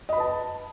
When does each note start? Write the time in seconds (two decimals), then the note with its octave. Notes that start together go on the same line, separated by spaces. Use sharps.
0.09 D#5
0.13 B5
0.16 B4
0.20 A5